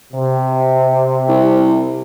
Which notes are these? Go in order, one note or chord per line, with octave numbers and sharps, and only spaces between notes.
C3
C2